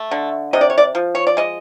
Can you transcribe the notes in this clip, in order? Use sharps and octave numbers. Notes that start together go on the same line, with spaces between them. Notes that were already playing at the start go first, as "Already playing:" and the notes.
Already playing: A3
D3
C3 D#5
D5
C#5
D5
F3
C#5
D5
G#3 D#5